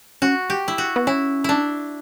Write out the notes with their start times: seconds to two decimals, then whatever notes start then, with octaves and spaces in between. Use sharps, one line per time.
0.22 C#4 F#4
0.50 G4
0.68 E4
0.78 F#4
0.96 B3
1.07 C#4 E4
1.44 D4 E4